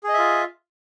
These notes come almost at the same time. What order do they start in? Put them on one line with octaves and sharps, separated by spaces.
G#4 D#5 E5 F4